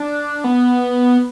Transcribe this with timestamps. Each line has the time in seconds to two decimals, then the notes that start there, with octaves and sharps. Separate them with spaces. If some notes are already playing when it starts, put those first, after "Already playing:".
Already playing: D4
0.44 B3